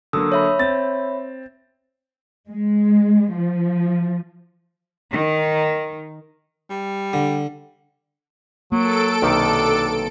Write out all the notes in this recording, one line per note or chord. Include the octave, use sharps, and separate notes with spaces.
D3 F#3 A#3 D#6 E6
C#5 E5 B5
C4 A6
G#3
F3
D#3
G3
D3
F#3 A#3 A4 D7
B1 C3 D#3 D4